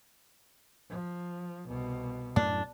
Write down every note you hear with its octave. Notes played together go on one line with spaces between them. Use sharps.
F3
C2 B2
F#2 A2 A3 D4